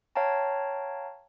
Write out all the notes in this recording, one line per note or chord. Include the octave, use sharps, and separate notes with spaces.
C#5 F5 G5 A5 A#5